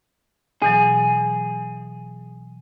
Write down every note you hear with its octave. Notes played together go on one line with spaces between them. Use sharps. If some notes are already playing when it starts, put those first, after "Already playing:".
B2 E3 F#3 G#4